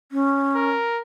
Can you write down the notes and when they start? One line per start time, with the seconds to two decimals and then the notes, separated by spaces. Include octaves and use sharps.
0.12 C#4
0.56 A#4